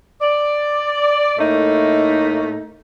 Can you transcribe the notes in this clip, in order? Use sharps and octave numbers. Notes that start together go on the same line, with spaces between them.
D5
A2 A3 A#3 D#4